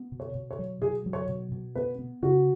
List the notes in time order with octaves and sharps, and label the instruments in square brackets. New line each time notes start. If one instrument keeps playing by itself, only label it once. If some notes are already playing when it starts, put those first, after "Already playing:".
Already playing: [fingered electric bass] B3
B2
[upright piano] C#5
[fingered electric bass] B2
[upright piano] C#5
[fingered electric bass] F#3
[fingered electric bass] B2 [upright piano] G#4
[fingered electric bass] F#3
[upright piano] C#5
[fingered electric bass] B2
B2
[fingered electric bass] B3 [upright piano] B4
[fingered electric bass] B3
[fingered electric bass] C#3 [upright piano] F#4